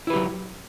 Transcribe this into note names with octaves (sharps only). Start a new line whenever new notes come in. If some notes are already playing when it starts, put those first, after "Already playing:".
F#3 E4 G4 B4